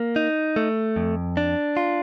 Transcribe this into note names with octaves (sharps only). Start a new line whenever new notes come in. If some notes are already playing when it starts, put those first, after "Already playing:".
Already playing: A#3
D#4
A3
F2
D4
F4